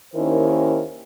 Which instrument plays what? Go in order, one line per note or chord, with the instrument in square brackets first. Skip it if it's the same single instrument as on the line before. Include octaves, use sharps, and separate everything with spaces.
[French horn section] D#2 D#3 C#4 E4 A#4 C5